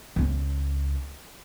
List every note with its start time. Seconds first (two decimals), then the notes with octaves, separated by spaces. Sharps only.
0.16 C#2 C#4